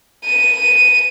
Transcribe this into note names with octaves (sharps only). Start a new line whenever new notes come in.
D#7